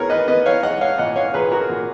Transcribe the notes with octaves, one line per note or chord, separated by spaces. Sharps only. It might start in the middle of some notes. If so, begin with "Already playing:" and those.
Already playing: B3 G#4 A#4 C#5
B4 D#5
B3 B4 D#5
C#5 F5
G#3 D#5 F#5
C#5 F5
A#2 D#5 F#5
C#5 F5
A#2 G#4 B4
F#4 A#4
A#2